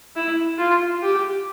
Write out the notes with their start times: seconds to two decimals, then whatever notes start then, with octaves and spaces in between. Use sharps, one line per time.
0.16 E4
0.58 F4
1.02 G4